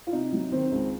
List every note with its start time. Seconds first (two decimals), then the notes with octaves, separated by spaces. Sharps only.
0.07 F4
0.13 C3 D#4
0.33 F#3
0.52 D#3 C4
0.72 C#2